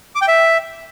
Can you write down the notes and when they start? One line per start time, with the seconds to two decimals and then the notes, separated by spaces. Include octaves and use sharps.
0.15 D6
0.22 G5
0.28 E5